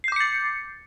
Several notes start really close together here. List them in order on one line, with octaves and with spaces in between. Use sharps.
C7 G6 D6 C#7 A6